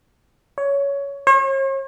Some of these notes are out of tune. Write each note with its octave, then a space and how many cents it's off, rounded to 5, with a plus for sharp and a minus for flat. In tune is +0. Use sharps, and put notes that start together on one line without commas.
C#5 +15
C#5 -45